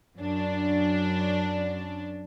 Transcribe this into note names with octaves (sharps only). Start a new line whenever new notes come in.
F#2 D4